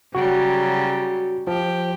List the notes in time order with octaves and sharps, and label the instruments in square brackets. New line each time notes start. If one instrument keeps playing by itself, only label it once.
[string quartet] C#3 F#3 G3 [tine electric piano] F#4
[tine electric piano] F3 [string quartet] G4